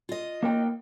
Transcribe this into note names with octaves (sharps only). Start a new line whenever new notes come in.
F4 D#5
A#3 A#4 G5